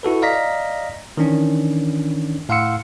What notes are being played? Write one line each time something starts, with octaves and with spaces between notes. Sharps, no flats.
E4 F#4 A4 B4
D5 D#5 F5 A#5 A#6 B6
D#3 E3 C#4 D4
A2 F5 F#5 C6 E6 C#7